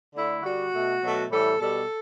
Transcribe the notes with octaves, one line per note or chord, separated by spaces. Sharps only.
D3 A3 E4
D3 G3 F#4
B2 A3
B2 F#3 A3
A2 E3 G3 A4
B2 G3 A4